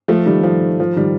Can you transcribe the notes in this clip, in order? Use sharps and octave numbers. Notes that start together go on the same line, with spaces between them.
F3 A3
D#3 G3
F3
F3
D#3 G3